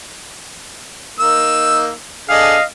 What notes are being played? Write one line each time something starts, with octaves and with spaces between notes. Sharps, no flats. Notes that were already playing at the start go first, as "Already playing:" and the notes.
A#3 D#4 E6
D4 G#4 A4 D#5 F5